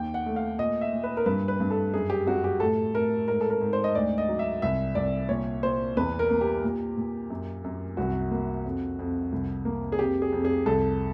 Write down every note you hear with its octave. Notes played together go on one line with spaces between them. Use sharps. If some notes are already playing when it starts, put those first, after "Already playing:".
Already playing: D#2 G5
F#5
A3
F5
A#2 D#5
E5
A#2
B4
A#4
G2 B4
B4
G2
A4
F#2 G#4
G4
F#2 F#4
G4
A2 A4
A2 A#4
G#2 A#4
A4
A#4
G#2
C5
D#5
D2 D5
D#5
F#3
E5
C2 E5
C2 D5
A#2 C#5
A#2 C5
E2 B4
A#4
A#3
G4
A#2
A#2
F#2
F#2
C2 F#4
A#3
F2
F2
C2
A#3
G#4
F2 G4
G#4
F2
G#4
C2 A4